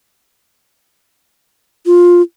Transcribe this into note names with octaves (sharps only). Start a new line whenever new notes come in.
F4